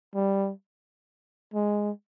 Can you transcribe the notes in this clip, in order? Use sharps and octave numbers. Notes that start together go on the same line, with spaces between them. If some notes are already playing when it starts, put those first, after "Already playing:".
G3
G#3